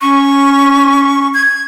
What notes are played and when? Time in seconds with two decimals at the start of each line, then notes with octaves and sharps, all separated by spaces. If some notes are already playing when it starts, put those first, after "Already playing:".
0.01 C#4 C#6
1.34 G#6